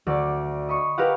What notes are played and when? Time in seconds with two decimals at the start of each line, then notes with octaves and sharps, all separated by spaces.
0.07 D2 D5
0.69 D#5 B5 C#6
0.98 G4 A#4 B4 F5 F#5